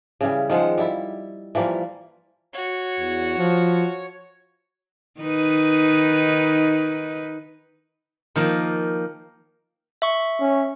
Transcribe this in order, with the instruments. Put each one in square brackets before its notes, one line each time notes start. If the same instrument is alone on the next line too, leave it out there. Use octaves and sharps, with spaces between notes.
[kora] C#3 E3 G3
D#3 F3 G#3 F#5
G3 E4
E3 F3 G3 A#3
[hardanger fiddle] F#4 [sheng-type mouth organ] C#5
[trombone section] E2
F3
[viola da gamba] D#3 D#4 B4
[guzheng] D#3 F3 A#3
[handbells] E5 C#6
[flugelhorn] C#4